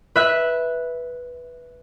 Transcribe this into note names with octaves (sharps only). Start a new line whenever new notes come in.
B4 E5 F#6